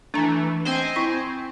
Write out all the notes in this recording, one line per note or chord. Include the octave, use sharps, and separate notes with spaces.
E3 A3 D4 A#5
C4 C5 D#5 G#5
E4 C#6